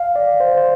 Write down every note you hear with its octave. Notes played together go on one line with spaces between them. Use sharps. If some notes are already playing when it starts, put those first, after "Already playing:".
Already playing: F5
D5
C5
C5